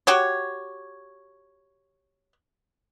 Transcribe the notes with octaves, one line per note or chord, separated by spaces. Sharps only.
F#4 G4 C#5